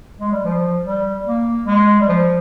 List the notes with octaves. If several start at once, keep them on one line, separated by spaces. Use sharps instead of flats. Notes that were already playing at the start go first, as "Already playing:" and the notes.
G#3
G3
F3
G3
A#3
G#3
G3
F3